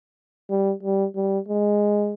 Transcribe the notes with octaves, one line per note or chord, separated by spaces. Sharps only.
G3
G3
G3
G#3